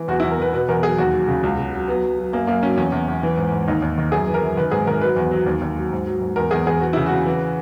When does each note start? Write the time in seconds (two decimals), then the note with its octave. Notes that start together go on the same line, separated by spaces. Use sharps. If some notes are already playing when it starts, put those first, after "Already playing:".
Already playing: E3
0.08 E2 F#4
0.20 E4
0.23 E2
0.31 A#4
0.39 E2 B4
0.53 B2 B4
0.69 E2 A#4
0.83 F#3 G#4
0.98 D#2 F#4
1.14 F#3
1.28 C#3
1.43 C#2
1.58 C#3
1.73 F#3
1.88 F#3 B3
2.03 F#3
2.18 F#3
2.33 F#2 A#3
2.47 F#2 A#3
2.62 F#3 C#4
2.77 E2 C#4
2.92 E2
3.08 E2
3.23 E3
3.38 G#2
3.52 G#2
3.68 D#2 D#4
3.82 D#2
3.98 D#3
4.12 F#2 G#4
4.27 E3
4.34 A#4
4.42 F#2
4.57 D#3 B4
4.71 G#2 G#4
4.87 D#3 A#4
5.01 F#3 B4
5.16 E2
5.31 F#3
5.46 D#2
5.62 D#2
5.76 F#3
5.92 G#2
6.07 F#3
6.21 G#2
6.36 E2 A#4
6.51 E2 G#4
6.67 E2 G#4
6.79 E3 F#4
6.93 C#3 E4
7.06 F#4
7.12 C#3
7.26 E3